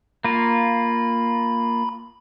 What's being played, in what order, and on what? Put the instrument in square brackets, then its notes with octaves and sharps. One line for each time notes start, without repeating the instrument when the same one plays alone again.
[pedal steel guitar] A#3 F4 [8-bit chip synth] B5